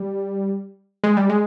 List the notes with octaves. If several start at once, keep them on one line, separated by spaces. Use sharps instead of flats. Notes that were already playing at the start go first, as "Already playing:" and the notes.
Already playing: G3
G#3
G3
G#3